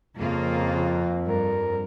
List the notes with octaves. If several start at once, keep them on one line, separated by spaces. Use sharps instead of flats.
F2 C#3 A#3 F4
G2 A#4